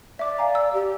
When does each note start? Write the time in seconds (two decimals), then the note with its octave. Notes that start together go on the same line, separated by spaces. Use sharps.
0.19 D5 E5 D6
0.38 F5 G#5 A#5
0.55 E6
0.73 G4